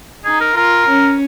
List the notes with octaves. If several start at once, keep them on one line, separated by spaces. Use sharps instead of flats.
D#4 G#4
A#4
F4 A#4
C#4